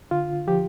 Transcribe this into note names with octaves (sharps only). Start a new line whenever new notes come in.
D3 F4
F3 G4